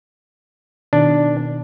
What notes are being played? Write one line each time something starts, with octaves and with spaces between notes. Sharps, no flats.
B2 D#3 D4